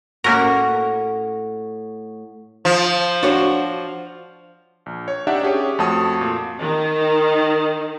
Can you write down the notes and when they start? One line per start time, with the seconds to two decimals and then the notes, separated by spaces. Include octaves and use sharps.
0.24 A2 A#3 C#4 F#4 A#4
2.65 F3
3.23 D4 F#4 C#5
4.86 A#1
5.08 C#5
5.27 D4 D#4 G4 D5 E5 F#5
5.43 C#4 G4 G#4 C#5
5.79 F2 A3 F#4 A5 D#6
6.21 A#2
6.58 D#3